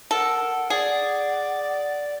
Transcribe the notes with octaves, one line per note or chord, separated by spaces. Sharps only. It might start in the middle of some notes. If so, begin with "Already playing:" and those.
A4 A#4 F#5
G#4 D5